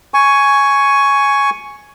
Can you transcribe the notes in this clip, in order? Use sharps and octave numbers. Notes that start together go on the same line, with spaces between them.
G#5 C#6